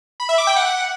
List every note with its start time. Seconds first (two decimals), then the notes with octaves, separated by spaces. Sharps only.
0.20 B5
0.29 E5
0.38 D6
0.47 G5
0.56 F#5